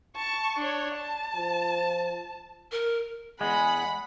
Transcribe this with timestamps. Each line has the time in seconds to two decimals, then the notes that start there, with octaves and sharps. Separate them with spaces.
0.16 A5 C#6
0.59 D4 C#5
0.95 A5
1.36 F3
2.72 A#4
3.41 E2 G#3 G#4 F#5 B5